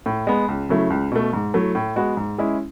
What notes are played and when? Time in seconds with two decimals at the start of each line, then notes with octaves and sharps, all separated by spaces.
0.06 A2
0.27 G#3 B3
0.48 C#2
0.69 C#3 F#3 A3 E4
0.90 C#2
1.12 B2 A3
1.33 G#2
1.54 F#3 A3 E4
1.75 A2
1.96 G#3 B3 F#4
2.17 G#2
2.38 G#3 C#4 E4 G#4